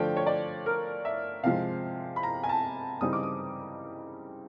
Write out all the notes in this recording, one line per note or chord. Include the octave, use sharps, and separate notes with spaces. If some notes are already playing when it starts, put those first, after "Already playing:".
Already playing: D3 F3 A3 D4 G5
C#5
D5
A#4
E5
C3 F3 G#3 F5
B5
A#5
G#5
A5
C#3 E3 G3 C4 D#4 D#6
D6
D#6